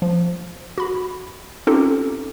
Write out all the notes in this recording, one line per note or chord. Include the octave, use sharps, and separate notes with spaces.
F3
F#4 B5
C4 C#4 D#4 F4 G4 A4